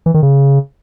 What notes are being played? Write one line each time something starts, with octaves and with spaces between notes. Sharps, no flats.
E3
D#3
C#3